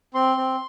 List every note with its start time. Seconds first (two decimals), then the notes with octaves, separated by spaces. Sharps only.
0.14 C4 C6
0.37 C4